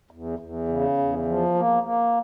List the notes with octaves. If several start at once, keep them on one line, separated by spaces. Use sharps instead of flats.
E2
E2
C#3
E2
F3
A#3
A#3